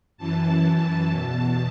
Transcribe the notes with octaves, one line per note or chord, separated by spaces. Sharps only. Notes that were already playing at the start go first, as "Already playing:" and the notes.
F#2 E3 A5
E2 B2 A5